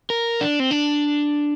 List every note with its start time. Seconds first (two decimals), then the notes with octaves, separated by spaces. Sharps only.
0.10 A#4
0.41 D4
0.60 C4
0.71 D4